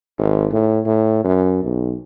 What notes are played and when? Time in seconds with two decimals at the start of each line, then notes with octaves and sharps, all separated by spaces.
0.18 G#1
0.52 A2
0.86 A2
1.24 F#2
1.63 B1